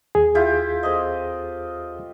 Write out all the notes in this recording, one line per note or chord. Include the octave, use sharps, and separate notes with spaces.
D#2 G#4
E4 F4 G4
C4 A4 D#5